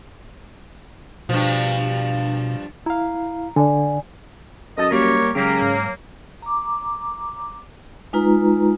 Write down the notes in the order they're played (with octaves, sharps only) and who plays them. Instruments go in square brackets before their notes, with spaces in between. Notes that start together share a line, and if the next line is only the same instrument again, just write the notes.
[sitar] G2 F3 [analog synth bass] B2
[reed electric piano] E4 F5 [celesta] A#5
[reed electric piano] D3 [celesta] D5 G#5
[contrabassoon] F#2 [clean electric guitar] A4 A5 [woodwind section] D#5
[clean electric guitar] G3 A#3 [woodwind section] G4 A#4 C#5
[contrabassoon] C#3 [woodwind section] F#3 A#3 [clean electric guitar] G#3 C#4 G4
[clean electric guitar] G#2
[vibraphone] A#5 D6
G#3 D#4 F4 B4 A#5